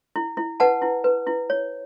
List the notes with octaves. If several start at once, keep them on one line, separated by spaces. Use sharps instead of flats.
E4
E4
B4 F#5 A5
E4
B4
E4
C#5